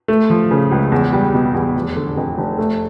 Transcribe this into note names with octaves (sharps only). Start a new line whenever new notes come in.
A3
F3
C#3
C#2
E2
G3
B2
E2
F1
D3
F2
F1
A3